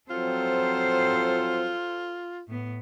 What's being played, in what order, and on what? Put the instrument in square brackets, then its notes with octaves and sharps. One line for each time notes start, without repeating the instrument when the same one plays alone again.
[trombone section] F3 F#3 C4 [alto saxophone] F4 [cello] A4 C5
[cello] A2 B3